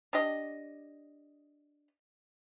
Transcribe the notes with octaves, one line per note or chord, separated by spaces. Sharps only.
D4 G4 D#5